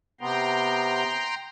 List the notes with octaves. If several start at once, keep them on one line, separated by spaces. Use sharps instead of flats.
C3 B3 G5 A#5 C6